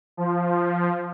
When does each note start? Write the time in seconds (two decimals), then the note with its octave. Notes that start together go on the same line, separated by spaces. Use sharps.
0.17 F3